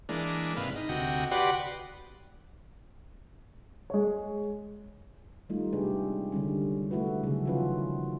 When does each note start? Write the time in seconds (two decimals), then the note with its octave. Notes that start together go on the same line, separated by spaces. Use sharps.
0.09 E3 G#3 A#3 D4
0.57 G#2 C3 B4 F5
0.76 D#4
0.89 D2 C3 F#4 D#5 G5
1.31 F#4 G4 B4 D5 F#5 C6
3.90 G#3 C#5
5.49 D#3 G3 A3 D#4 F4
5.73 C3 G#3 D4 G4 G#4 B4
6.32 D3 D#3 G3 C#4
6.91 A3 E4 F#4 B4
7.23 C#3 F#3 G#4
7.45 D#3 F3 C#4 F4 F#4 B4